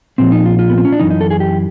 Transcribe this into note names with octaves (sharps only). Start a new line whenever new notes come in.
A#2 F3 C4
D#4
F4
F4
B3
C4
C#4
D4
F#2 C#3 E3 D#4
D#4
A4
G#4
G4